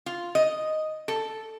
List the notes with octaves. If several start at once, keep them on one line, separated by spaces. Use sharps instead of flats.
F4
D#5
A4